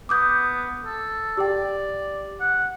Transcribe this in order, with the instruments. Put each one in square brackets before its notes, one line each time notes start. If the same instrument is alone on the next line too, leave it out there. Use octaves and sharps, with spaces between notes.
[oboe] B3 [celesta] D6 D#6 G6
[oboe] A4
[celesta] G4 G5 [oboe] D5
[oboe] F#5